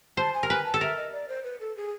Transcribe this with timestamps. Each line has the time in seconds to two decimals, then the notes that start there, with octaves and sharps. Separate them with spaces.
0.17 C5 A5
0.34 G#5
0.43 A#4
0.49 B4 G#5
0.65 A5
0.74 A4
0.81 A#4 E5
0.97 D#5
1.12 D5
1.29 C5
1.44 B4
1.60 A4
1.76 G#4